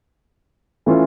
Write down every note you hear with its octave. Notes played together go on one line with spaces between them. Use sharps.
E3 A3 C#4 F4 A4